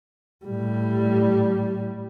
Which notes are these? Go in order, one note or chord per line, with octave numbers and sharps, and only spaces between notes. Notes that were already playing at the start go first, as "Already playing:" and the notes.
A2 G3